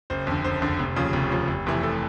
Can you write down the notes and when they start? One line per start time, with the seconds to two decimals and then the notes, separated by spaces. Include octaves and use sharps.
0.10 F#1 C5
0.27 F2 D3
0.44 F#1 C5
0.62 F2 D3
0.79 F1
0.96 D#2 C#3 F3
1.13 F1
1.31 D#2 C#3 F3
1.48 F1
1.66 F2 C3 E3 A3
1.83 A4